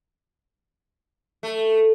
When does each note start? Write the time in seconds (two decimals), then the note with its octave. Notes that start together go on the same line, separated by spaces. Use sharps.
1.43 A3